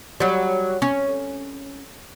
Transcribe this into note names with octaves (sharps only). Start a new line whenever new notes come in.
F#3 G3
C#4